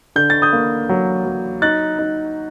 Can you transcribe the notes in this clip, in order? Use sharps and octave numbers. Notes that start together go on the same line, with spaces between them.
D3 G6
A6
D#6 G6
A#3
F#3
F#3
D#4 F#6 A6
D#4